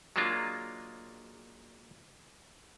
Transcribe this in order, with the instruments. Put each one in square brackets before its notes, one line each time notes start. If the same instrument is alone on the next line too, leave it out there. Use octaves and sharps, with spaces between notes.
[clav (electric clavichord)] F#3 G#3 A#3 D4 F4